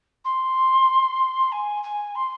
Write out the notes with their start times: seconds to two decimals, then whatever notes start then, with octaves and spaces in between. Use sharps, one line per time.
0.24 C6
1.52 G#5
1.83 G#5
2.15 C6